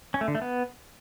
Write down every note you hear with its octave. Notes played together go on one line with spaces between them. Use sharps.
C#4
A3
D3
A3
B3